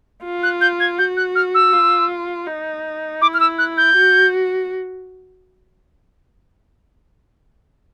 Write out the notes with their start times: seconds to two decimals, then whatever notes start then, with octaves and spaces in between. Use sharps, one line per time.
0.24 F4
0.43 F#6
0.61 G6
0.80 G#6
0.98 F#4 G6
1.17 F#6
1.35 F6
1.55 E6
1.73 F4
2.47 D#4
3.22 E4 D6
3.34 F6
3.40 E6
3.58 F#6
3.77 G6
3.96 F#4